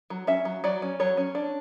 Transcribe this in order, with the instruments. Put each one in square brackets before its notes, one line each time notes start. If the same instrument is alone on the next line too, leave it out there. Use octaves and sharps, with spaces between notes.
[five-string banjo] F#3
C#4 E5
F#3
F#3 D5
C#4
F#3 C#5
C#4
D4